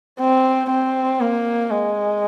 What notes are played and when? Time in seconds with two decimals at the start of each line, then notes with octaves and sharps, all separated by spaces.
0.20 C4
0.70 C4
1.21 A#3
1.71 G#3